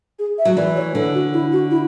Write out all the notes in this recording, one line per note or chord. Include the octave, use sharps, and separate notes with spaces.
G#4
E5
F#3
E3 D5
C#5
D3 A4
F#4
E4
F#4
E4